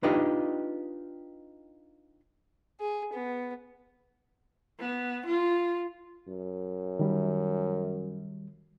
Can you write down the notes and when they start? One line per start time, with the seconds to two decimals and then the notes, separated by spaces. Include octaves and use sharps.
0.03 D4 D#4 F4 G4 B4 D#5
2.80 G#4
3.14 B3
4.79 B3
5.26 F4
6.29 F#2
6.99 D#3 G3